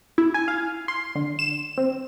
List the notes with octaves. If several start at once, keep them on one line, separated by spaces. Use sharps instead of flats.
E4
G#5
F5
C6
D3
E7
C4